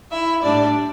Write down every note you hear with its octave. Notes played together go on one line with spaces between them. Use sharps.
E4 E5
A2 G3 D4 D5